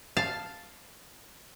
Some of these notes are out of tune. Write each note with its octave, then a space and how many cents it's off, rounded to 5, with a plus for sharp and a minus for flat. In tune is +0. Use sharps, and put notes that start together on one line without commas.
F5 +0 A5 +0